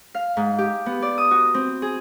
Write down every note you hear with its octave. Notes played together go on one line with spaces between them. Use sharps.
F5
G#2
G4
B3
D5
D#6
F#4
C4
G#4